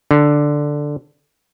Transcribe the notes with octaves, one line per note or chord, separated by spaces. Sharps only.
D3